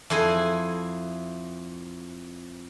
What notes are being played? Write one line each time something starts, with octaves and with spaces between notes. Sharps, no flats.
F2 E4 G#4 G#5